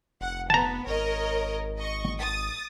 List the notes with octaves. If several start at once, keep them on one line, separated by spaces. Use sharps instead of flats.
F1 F#5
B3 A5 A#5
G#1 A#4 C#5 D#5
D#5 C#6
D#6 A6